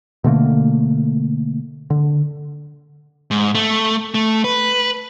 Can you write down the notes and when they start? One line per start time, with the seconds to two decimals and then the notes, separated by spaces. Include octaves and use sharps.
0.24 B2 D3 A3 A#3
1.90 D3
3.31 G#2
3.55 A3
4.14 A3
4.44 B4